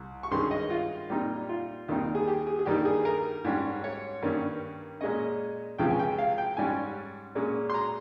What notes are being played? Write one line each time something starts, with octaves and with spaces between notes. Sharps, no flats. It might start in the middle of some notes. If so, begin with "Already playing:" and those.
Already playing: C2
C#6
G2 D#3 G#3 C#4 C6
D#5
F4
A#2 G3 C4 D#4
F4
D#2 D#3 G3 C4 D#4
G#4
G4
G#4
G#4
G2 D#3 G3 A#3 D#4 G4
G#4
A#4
G#2 G3 C#4
C#5
G2 D#3 G3 A#3 C#4
A#2 G#3 C#4 D#5
C#2 C3 F3 G#3 C#4 G5
G#5
G5
F5
G5
G#2 G3 C#4 G#5
A#2 G#3 C#4
C6
A#5